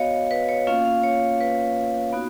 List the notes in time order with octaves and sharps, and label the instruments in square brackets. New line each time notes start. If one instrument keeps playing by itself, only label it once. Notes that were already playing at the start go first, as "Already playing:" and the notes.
Already playing: [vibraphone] B3 F#4 C#5 D#5 F5
B4
C#5
A#3 C#4 F4 F5
F5
C#5
B4
B3 D#4 F#4